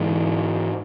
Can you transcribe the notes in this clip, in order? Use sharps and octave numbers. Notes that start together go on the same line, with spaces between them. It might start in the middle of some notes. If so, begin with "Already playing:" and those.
Already playing: G#2 E3 G#3